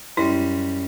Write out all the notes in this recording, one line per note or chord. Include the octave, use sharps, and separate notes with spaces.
F#2 G3 E4